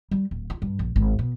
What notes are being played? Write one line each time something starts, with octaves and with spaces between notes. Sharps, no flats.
G3
D1
F4
G2
A#1
G#1
B2